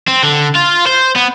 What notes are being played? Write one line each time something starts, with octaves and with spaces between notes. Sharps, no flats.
C4
D3
F4
C5
B3